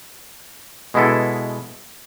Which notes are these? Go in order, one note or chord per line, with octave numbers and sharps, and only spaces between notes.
B2 G#3 B3 E4 A4